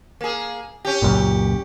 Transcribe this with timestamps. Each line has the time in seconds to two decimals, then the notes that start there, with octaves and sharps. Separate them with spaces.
0.21 A#3 G#4
0.85 C#4 G4
1.02 C#2 F#2 A#2